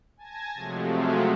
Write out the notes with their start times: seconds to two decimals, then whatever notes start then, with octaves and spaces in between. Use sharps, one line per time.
0.17 G#5 A5 G#6 A#6
0.54 C3 F3 F#3 G#3 A3